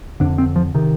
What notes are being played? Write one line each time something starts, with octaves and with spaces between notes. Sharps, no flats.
F2 D3 D4
C4
F3
C3 D#3